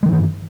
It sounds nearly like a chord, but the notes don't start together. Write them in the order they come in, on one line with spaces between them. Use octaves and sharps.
G#3 D#3 E3 G2